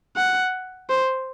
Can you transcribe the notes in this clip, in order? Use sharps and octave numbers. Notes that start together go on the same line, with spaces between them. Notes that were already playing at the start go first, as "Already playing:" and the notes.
F#5
C5